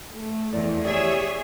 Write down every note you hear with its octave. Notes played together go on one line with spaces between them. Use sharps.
A3
E2 E4 D5
G4 G#4 C#5 D5 E5